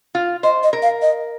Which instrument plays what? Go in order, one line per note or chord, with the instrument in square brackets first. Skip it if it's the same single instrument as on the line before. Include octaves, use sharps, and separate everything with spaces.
[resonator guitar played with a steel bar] F4
[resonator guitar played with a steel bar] C5 [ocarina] D#5
[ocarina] D#5
[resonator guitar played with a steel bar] A#4
[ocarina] F5
D#5